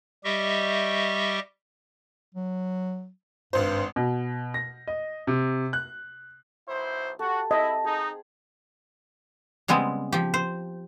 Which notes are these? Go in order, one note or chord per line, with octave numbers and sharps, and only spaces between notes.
G3 G4 D#5 E5 C#6
F#3
G#1 G2 C5
B2
A#6
D#5
C3
F#6
B1 E4 C5
F#4 G4 A4
C4 E4 A4 D#5 A5
D#4 G#4
C#3 G3 G#3 B3 C4
F3 G4
C5